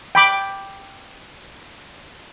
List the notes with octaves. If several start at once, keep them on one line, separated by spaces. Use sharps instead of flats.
G5 B5 D6